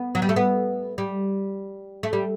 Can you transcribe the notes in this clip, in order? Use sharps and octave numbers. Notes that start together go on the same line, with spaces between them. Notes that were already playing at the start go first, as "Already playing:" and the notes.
Already playing: B3
F#3
G3
A3
B3
G3
A3
G3